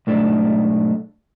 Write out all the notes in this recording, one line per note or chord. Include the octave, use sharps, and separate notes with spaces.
B1 G#2 A3 D4